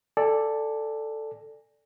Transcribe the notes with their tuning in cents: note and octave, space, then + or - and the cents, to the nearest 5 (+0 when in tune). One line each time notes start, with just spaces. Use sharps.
A4 +5 D5 +0 G#5 -25